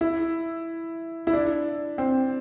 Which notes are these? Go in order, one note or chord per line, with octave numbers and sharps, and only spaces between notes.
E4
E4
D4
C4